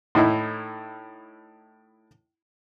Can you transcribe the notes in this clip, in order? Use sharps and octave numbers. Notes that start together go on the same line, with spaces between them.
A2 D#4 E4